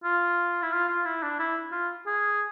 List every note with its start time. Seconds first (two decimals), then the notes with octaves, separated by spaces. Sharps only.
0.04 F4
0.62 E4
0.72 F4
0.88 F4
1.05 E4
1.23 D4
1.39 E4
1.72 F4
2.06 G#4